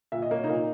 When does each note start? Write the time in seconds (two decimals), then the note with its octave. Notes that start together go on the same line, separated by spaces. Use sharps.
0.12 A#2 E5
0.22 D#5
0.31 A#3 C#5
0.43 D#4 D#5
0.49 A#2